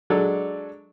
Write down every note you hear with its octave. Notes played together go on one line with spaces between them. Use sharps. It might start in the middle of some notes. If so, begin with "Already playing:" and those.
F#3 G#3 D4 A4 D5